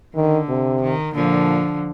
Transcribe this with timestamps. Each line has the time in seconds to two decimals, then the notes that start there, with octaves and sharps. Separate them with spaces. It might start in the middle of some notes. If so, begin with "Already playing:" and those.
0.16 D3 D#3
0.49 C3
0.82 D#3
1.15 A#2 D3 F3